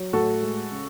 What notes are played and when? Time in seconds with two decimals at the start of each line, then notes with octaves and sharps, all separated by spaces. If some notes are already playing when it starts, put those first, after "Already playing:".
Already playing: F#3
0.13 A2 F#4 A4
0.42 G#3
0.71 C#3